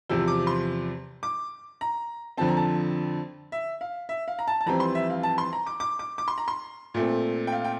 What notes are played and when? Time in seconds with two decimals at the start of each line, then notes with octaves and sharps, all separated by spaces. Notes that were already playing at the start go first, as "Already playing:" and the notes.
0.09 E2 C3 F3 C4 E6
0.28 D6
0.47 C6
1.23 D6
1.81 A#5
2.37 F2 D3 F3 C4 A5
2.48 A#5
2.57 A5
3.52 E5
3.81 F5
4.09 E5
4.28 F5
4.39 A#5
4.48 A5
4.61 A5
4.66 F2 E3 G3 C4 A#5
4.80 C6
4.95 E5
5.10 F5
5.23 A5
5.38 C6
5.53 A#5
5.67 D6
5.80 D6
5.99 D6
6.18 D6
6.28 C6
6.38 A#5
6.48 C6
6.94 A#2 A3 C4
7.47 G5
7.52 F5
7.64 G5